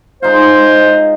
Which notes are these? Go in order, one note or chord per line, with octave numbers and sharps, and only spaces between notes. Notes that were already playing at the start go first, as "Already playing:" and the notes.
G#3 D#4 F4 C5